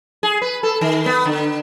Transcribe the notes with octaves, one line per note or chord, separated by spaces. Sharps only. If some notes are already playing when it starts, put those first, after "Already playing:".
G#4
B4
A4
D#3
B3
D3